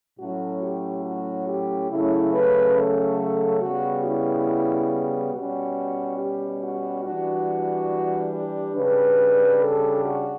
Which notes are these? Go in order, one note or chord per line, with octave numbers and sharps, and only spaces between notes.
A2 F#3 A3 C#4 F#4
G4
F#4
G4
C#3 F#3 A3 C#4 E4
B4
A4
C#3 G3 B3 F#4
E4
B2 G3 C#4 F#4
G4
F#4
E3 G3 D4 F#4
G4
C#3 G3 D4 B4
A4
F#4